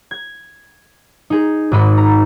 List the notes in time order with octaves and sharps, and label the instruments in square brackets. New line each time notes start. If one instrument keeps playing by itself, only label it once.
[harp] G#6
D#4 G#4
G#1 G#2 D#5 B5
A#5